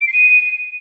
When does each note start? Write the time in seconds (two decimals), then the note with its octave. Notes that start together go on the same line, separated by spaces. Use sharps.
0.01 D7
0.07 C7
0.13 D#7